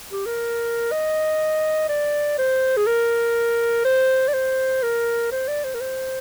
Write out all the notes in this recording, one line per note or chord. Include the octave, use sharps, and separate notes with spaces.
G4
A#4
D#5
D5
C5
G#4
A#4
C5
D5
C5
A#4
C5
D5
C5
A#4
C5